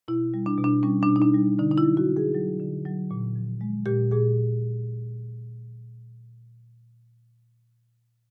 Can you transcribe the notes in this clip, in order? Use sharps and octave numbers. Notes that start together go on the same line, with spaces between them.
B2 E4
G3
D4
B2
D4
G3 C#4
D4
B2
D#4
D4
G3
D3 D#4
D#4
E4
F#3
F#4
D3
G#4
F#3
D3
F#3
A#2
F3
G#3
A#2 G4
A#2 G#4